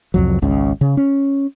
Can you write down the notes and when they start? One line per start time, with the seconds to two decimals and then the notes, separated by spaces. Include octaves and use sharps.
0.14 C2 F2 F#3
0.42 G#1 C#2 C#3
0.81 C#3
0.97 C#4